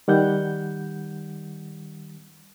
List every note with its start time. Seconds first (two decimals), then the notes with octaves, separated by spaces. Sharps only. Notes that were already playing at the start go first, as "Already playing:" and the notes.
0.08 D#3 G3 F#5 G6